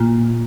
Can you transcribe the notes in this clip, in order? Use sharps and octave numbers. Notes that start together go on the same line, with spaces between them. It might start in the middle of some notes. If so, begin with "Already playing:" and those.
Already playing: A#2